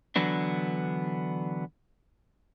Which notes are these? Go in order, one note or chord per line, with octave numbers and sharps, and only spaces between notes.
D3 E3 F#3 B3 D4